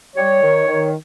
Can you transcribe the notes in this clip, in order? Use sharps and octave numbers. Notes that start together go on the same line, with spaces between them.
G3 C#5
D#3
D#3